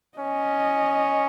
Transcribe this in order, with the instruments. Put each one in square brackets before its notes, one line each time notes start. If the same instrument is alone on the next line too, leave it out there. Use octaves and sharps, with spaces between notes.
[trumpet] C#4 [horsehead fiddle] D#5